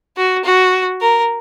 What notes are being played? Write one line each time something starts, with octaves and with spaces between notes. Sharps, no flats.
F#4
F#4
A#4